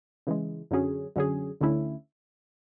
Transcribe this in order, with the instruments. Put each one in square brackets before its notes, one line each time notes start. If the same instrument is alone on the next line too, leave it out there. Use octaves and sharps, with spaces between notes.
[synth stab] C#3 E3 G#3
F#2 D3 F#3 C#4 G#4
F#2 D3 F#3 C#4 G#4
D2 D3 A3 C#4 E4